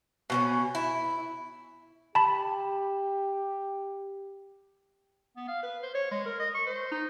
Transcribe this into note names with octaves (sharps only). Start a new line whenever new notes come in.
B2 C4 C#4
E4
G4 A5 B5
B3
F5
B4
C5
C#5
G#3
A#4
D#5
C#6
C5
D#4